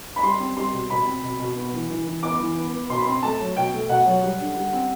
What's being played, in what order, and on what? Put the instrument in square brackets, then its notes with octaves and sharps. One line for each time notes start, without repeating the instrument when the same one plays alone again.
[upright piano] B5
G3 C6
C4
G3 C6
B2
B2 B5
C4
B2
B2
B3
E3
E3
E3
B3 D6
E3
B3
B3
B2 C6
B5
C4 C6
A3 A5
F#3
B2 G5
A3
B2 F#5
F#3
G3
D3
G3
C4